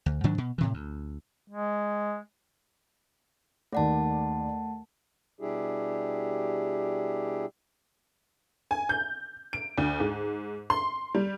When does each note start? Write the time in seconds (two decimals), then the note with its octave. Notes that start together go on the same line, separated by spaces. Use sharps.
0.06 D2
0.24 G#2 D#3 F#3 D4
0.38 B2
0.58 A2 C3 E3
0.74 D2
1.49 G#3
3.73 D#2 A3 D5 F#5 A5
5.41 B2 G3 D4 E4 G4 G#4
8.71 G#5
8.89 G6
9.53 D7
9.78 D2
10.00 G#2
10.70 C6
11.15 G3